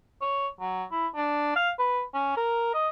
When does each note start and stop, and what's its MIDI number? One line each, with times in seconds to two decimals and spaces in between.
0.21 0.48 73
0.60 0.84 54
0.91 1.07 64
1.15 1.54 62
1.56 1.70 77
1.79 2.01 71
2.14 2.32 61
2.37 2.70 70
2.74 2.89 75